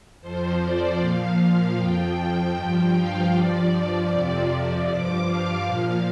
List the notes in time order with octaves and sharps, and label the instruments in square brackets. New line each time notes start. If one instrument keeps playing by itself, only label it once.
[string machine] F2 F3 C5
D5
A#2 F3 F5
F2 F3 G5
G5
G2 F3
F5
G2 F3 D5
F2 C3 F3
D5
G2 F3 D6
F5
A#2 F3